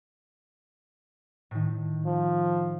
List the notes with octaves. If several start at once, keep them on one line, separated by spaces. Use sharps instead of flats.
A2 D#3
F3